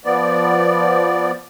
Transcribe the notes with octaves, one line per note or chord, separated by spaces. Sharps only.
F3 B3 D5